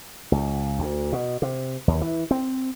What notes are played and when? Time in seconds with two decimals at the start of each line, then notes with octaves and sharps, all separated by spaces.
0.32 C#2
0.79 D2
1.13 B2
1.42 C3
1.88 D#2
2.01 E3
2.31 C4